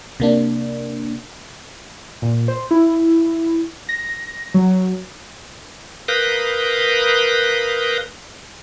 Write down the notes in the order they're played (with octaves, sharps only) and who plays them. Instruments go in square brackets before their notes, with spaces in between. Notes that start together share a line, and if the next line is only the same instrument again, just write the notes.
[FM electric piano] C3 A#3 D4
[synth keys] A#2
C5
E4
A#6
F#3
[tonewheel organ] A#4 B4 F5 D#6 F#6 G6